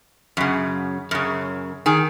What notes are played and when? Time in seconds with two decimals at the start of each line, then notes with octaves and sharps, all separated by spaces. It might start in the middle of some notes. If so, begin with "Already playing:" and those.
0.37 F#2 C#3
1.11 F#2 C#3
1.86 D#3 G#4